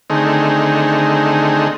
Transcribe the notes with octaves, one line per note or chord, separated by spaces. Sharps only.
D3 D#3 A3 C4 D#4 G#4